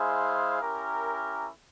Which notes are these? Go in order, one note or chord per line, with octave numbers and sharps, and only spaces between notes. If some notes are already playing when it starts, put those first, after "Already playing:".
Already playing: G#3 E4 G#4 C5 F5
C#4 E4 G4 A#4